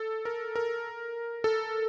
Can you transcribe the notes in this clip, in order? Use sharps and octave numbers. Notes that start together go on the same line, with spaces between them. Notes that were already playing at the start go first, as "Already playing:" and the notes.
Already playing: A4
A#4
A#4
A4